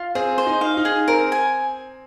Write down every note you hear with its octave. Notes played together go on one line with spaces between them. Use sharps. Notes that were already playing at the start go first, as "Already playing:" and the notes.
Already playing: F4
C4 G#4
C5
D#4
F5
D#4
G#4
C4 A#4
G#5